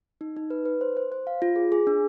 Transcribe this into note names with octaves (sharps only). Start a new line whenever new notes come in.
D#4
D#4
B4
B4
C5
C5
C5
F5
F4
G#4
G#4
D4